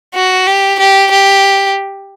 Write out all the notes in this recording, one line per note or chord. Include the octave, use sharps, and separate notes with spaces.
F#4
G4
G4
G4